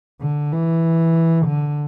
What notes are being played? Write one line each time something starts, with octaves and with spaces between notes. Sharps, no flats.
D3
E3
D3